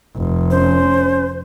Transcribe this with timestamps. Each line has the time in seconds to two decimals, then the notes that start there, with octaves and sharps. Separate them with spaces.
0.16 F1
0.51 C#4 C5